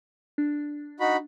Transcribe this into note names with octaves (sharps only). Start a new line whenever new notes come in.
D4
D#4 F#4 B5